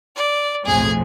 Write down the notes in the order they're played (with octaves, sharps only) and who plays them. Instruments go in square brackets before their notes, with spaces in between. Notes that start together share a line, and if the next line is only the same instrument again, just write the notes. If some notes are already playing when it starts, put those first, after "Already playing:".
[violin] D5
[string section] B1 F2 A2 [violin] G#4 G#5